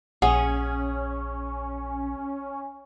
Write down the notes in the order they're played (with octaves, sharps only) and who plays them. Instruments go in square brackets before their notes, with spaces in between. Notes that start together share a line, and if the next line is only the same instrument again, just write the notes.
[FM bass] A#1 [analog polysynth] C#4 [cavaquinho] G#4 [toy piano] F#5